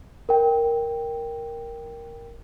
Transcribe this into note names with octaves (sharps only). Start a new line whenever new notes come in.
A#4 G5